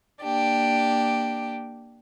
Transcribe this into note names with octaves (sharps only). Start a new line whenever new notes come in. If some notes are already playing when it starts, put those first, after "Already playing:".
A#3 D4 G4